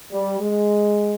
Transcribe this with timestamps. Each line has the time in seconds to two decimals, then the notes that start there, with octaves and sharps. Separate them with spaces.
0.12 G3
0.40 G#3